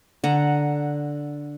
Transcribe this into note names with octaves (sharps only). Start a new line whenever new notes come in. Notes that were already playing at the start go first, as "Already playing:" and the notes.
D3 F#5 A#5